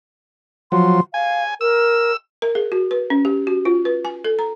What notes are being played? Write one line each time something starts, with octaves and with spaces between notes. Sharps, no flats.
F3 F#3 C6
F5 G#5
A#4 E6
A#4
G#4
F#4
B4
C#4
G4
F#4
F4
B4
G#5
A4
A#5